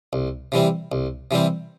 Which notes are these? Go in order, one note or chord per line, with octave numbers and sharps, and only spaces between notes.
C2
C3 E3 G3 C4
C2
C3 E3 G3 C4